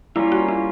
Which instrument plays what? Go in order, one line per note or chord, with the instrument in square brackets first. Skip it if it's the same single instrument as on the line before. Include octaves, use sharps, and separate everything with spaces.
[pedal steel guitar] G3 A#3 C#4 F4 [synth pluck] E4
[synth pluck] F#4
E4